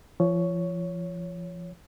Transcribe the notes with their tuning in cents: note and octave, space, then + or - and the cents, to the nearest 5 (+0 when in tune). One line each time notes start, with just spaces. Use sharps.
F3 -30 C#5 +10